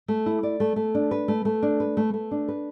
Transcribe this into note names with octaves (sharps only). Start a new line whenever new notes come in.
A3
E4
D5
A3
A3
D4
B4
A3
A3
D4
B4
A3
A3
D4
B4